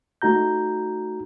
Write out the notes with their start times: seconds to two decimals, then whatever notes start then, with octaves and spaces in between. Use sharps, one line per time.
0.22 A3 D#4 F#4 A#5 G6